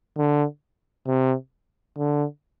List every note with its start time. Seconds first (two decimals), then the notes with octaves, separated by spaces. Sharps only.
0.17 D3
1.07 C3
1.97 D3